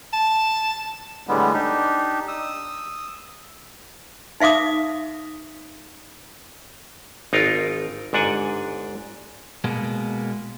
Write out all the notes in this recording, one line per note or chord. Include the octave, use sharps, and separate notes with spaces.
A5
A2 D3 G3 G#3 B3
D4 D#4 G4
D#6 E6
D#4 E5 F5 D6 D#6
G#1 D#4 F4 A#4
G1 G#2 D4 F#5 G#5
B2 G#3 A#3 B3